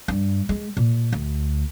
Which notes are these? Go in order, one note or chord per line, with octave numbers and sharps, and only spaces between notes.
G2
G#3
A#2
D2